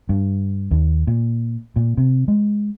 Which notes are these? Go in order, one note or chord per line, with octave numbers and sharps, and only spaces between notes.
G2
D#2
A#2
A#2
C3
G#3